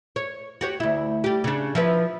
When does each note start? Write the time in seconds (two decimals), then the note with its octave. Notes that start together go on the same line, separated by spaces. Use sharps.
0.16 C#5
0.61 F#4 G4 C#5
0.80 D2 E4
1.24 G3 G4
1.44 C#3 D4
1.75 F3 E4 B4